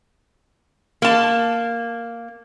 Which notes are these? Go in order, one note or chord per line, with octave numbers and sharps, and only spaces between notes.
A#3 A5